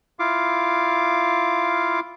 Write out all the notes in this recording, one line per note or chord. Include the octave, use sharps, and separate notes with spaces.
E4 F4 F5 D6